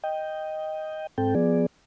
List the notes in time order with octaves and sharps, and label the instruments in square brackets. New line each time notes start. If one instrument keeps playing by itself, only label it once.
[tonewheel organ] D#5 G5
G#2 C4 A4 G5
F3 B3 G#4 D5